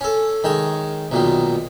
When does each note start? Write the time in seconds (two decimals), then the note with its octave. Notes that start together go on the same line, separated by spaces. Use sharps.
0.01 C#4 A4
0.44 D#3 G#3 C#5
1.11 B1 A#2 D#3